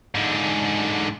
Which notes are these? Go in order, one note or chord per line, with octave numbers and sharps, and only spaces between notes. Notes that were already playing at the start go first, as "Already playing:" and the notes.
G#2 D3